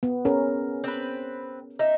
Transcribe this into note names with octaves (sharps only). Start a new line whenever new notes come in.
B3
C#4 G#4 A#4
C4 B4
D#4 E5